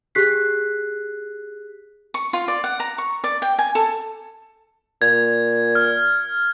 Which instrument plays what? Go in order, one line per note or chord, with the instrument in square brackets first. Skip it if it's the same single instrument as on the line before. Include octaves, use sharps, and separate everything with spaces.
[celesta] G4 G#4 F#6 B6 C7
[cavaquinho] C#6
F4
D5
F#5
A#5
C#6
D5
G5
G#5
A4
[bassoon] A#2 [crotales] G#6
[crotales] F6